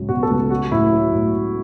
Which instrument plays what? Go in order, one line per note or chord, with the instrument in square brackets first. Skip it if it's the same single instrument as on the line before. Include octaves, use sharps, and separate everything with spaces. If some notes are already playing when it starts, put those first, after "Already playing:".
Already playing: [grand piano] C#2 A2 F#3
B2 F#4
A4
C#2
F#3 F#4
A2 E4
F#3
A2